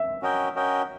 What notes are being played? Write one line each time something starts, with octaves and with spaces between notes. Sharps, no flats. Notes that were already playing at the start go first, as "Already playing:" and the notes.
Already playing: E5
C#4 F#4 A#4 D#5 G5
C#4 F#4 A#4 D#5 G5